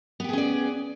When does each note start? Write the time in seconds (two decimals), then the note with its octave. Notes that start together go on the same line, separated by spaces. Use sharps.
0.20 B3
0.24 G4
0.29 G#4
0.33 C#4
0.38 D5